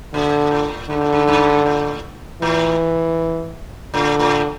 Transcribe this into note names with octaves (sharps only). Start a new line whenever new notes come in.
A#2 D3
A2
G2 D3
A2
G2
G2
A2
A2 E3
A2 D3
A2